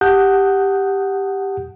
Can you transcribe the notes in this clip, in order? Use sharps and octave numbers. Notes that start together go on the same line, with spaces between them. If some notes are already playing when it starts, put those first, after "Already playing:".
G4 F#5 A5 D#6 F#6 G6